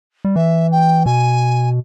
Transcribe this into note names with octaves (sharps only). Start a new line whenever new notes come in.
G3
E3 E5
G5
B2 G#5